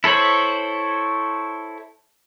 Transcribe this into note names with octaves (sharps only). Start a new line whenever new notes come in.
E4 A4 C5 C#5 B5